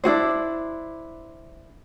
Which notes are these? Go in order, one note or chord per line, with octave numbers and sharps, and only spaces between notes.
D4 E4 F#4 C5